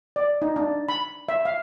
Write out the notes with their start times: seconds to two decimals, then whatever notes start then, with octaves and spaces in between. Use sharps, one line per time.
0.16 D5
0.42 D#4
0.56 D4
0.89 B5
1.29 E5
1.45 F5